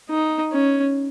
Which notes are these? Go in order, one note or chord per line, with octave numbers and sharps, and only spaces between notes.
D#4
C#4